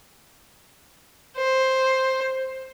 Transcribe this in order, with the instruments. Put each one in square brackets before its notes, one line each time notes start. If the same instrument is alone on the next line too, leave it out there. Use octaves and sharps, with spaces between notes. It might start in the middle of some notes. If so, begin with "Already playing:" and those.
[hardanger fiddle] C5